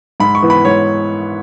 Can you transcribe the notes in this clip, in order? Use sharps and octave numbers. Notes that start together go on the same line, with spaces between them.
G#2 B5
C#6
E3 B3
B5
G#2 C#5